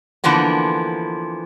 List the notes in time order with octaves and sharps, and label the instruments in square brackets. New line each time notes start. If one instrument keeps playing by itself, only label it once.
[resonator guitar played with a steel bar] D3 E3 F3 A#3 B3